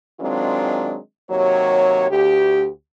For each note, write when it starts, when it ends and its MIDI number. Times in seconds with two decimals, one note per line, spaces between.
0.21 0.97 51
0.21 0.97 54
0.21 0.97 56
0.21 0.97 60
0.21 0.97 62
0.21 0.97 65
1.30 2.08 39
1.30 2.08 48
1.30 2.08 54
1.30 2.08 73
2.11 2.68 38
2.11 2.68 67